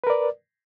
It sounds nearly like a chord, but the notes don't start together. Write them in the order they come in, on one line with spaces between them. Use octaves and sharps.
B4 A#4 D5